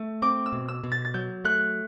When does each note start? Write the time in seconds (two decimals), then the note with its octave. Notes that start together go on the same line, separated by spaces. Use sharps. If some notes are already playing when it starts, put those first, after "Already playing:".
Already playing: A3
0.22 C4 D6
0.46 E6
0.52 B2
0.68 E6
0.84 B2
0.92 A6
1.05 A6
1.14 F#3 G6
1.45 A3 F#6